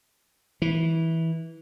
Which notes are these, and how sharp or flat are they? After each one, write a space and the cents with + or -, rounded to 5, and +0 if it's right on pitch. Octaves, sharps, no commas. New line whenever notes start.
E3 -15